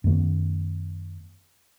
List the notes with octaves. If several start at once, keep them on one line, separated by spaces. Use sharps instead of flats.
F#2 D#3 A3 B3